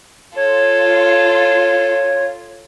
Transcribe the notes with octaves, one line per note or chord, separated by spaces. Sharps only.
F4 A4 C#5